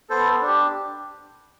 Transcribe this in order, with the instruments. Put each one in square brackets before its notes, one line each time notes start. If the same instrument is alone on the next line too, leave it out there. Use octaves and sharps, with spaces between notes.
[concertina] B3 A4 C5
D4
G4